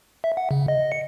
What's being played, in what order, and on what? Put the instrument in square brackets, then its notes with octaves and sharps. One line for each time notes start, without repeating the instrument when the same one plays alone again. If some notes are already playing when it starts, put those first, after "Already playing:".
[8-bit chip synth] E5
F#5
C#3
D#5
C#7